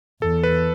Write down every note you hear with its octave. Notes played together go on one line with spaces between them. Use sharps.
E2 A4
B4